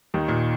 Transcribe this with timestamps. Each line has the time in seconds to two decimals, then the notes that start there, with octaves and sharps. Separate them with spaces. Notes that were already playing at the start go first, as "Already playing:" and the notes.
0.14 D#2 D#3
0.28 A#2